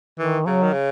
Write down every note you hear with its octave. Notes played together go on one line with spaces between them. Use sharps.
D#3 E3
C#3 F#3
D#3
C#3